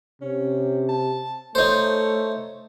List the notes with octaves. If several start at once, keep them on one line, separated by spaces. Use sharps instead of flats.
C3 C#4
A5
A3 D#4 C5 C#5